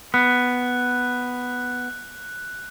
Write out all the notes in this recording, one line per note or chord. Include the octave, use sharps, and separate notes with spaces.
B3 F#6